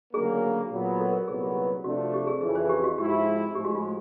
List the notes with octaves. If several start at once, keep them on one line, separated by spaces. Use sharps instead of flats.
D2 C#3 F#3 A#3 G#4
A#2 F#3 B3
A4
A#4
C2 A#2 F#3 B3 G#4
G4
C3 F3 A3 D4 F#4
G4
G#4
F2 C#3 E3 G#4
C5
G4
F#4
G#2 F3 G#3 C4 E4 G4
A2 F3 G#3 G4
F#4
F4